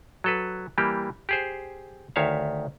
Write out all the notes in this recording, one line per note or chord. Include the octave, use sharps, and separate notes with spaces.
F#3 A4 B4
E3 G3 A#3 G4
G4 G#4 C5
D2 D#3 C#5 E5 F5